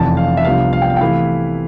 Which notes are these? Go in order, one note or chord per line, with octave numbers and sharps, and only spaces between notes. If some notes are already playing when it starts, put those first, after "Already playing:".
Already playing: F1 F2 E3 A5
F5
E5
C2 C3 F3 B3 D4 F5
F5
G5
F5
G5
C3 E3 A3 E4 F5